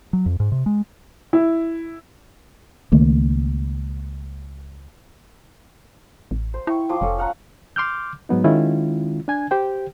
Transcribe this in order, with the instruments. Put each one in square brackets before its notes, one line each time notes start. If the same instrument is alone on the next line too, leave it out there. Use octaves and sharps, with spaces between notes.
[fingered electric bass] F#3
F2
G#2
C3
G#3
[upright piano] E4
[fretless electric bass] C#2 D#3 A3 A#3
[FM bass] A1
[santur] C5
[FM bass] E4 [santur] G5 C#6
[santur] F3 C6 D6
[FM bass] F1 [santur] C#4 A4
[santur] F5 F#5 A#5
[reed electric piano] C6 D6 F6 G6
G#2 F#3 B3 D#4
D#3 G#3 C#4 E4 F4
D4 G#5 G#6
G4 C5 G5